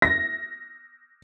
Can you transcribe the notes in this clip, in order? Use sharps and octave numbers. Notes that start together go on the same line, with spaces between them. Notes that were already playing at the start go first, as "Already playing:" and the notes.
A#6